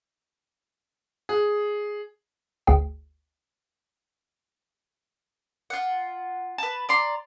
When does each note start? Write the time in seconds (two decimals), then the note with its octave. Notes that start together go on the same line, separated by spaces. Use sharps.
1.29 G#4
2.67 G1 D2 G#4 G5
5.70 F4 F#5
6.58 B4 A5
6.89 D5 A#5 C6